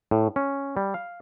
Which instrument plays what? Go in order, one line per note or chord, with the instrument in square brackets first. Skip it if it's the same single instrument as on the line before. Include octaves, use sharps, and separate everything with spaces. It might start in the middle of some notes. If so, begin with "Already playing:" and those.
[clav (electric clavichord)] A2
C#4
G3
F5